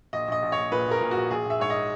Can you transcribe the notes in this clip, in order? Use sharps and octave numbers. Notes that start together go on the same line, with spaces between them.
A#1 D#5
A#1 D#5
A#1
A#1 C#5
A#2 B4
A#1
A#4
A#2
A#1 F#4
A#1 G#4
A#1 E5
G#2 C#5
D#5